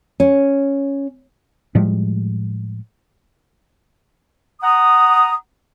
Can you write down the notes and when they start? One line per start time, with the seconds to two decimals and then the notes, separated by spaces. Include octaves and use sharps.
0.20 C#4
1.75 A2 F3 G3 G#3
4.61 F#5 A#5 D#6